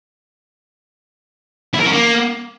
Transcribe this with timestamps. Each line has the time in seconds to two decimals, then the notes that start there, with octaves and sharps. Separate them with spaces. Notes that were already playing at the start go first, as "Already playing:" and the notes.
1.74 E4
1.80 A#4
1.86 C#4
1.92 A#3